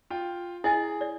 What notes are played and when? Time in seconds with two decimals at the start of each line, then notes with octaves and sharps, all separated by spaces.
0.10 F4 G5
0.64 E4 G#4 D#5 G#5
1.01 D5